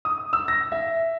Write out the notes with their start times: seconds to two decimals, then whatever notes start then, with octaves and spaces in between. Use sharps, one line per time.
0.05 D#6
0.33 E6
0.48 A#6
0.72 E5